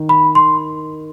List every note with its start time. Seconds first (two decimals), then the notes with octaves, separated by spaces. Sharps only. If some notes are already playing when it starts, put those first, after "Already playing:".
Already playing: D#3
0.09 B5
0.35 C6